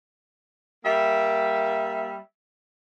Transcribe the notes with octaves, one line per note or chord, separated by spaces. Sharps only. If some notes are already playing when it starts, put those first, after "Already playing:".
G3 A#3 E5